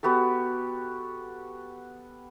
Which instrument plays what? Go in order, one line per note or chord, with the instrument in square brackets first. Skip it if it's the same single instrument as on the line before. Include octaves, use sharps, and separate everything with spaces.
[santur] B3 F#4 G4 A4